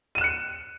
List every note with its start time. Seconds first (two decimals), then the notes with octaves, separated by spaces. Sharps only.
0.15 D#7
0.18 E7
0.21 F#6
0.24 C#7